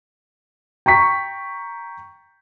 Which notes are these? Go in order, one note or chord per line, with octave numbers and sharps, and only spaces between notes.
G5 A#5 C#6 B6